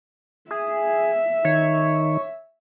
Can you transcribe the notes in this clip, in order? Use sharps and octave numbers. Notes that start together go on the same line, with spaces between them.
G#4 E5
D#3 C#5